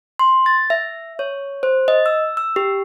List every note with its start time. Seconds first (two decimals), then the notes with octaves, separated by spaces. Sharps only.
0.19 C6
0.46 A6
0.70 E5
1.19 C#5
1.63 C5
1.88 D#5
2.06 E6
2.37 E6
2.56 G4